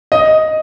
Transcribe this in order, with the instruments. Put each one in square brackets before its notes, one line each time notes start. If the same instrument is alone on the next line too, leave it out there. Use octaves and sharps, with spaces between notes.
[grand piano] D#5